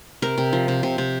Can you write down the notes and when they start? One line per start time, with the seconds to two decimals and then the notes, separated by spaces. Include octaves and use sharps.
0.22 C3 A#4
0.38 C3
0.53 F3
0.68 C3
0.83 C3
0.98 C3